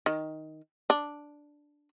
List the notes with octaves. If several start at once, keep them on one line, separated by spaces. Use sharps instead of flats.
D#3
D4